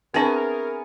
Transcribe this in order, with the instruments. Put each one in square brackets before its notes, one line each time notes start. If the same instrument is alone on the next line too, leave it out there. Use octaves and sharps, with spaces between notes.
[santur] B3 G#5 C#6 [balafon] C4 D4 [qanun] E4 G#4 [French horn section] A#4